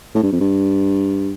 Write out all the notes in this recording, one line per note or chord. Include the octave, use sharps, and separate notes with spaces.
A2
G2
F2
G2